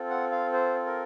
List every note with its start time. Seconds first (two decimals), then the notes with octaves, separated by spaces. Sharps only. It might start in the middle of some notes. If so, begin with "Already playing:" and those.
Already playing: C4 F4 A4
0.10 F#5
0.32 F5
0.53 C5
0.86 A#4